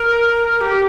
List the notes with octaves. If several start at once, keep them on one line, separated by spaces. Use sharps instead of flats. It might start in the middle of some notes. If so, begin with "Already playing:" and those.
Already playing: A#4
G4